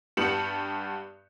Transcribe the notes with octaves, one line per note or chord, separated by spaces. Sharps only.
G2 B3 G4 C#7 E7 F#7